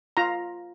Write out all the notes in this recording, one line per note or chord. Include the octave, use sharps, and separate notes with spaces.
F4 A#5